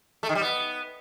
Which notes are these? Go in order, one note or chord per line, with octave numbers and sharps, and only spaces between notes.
A3
D#3
G3
B3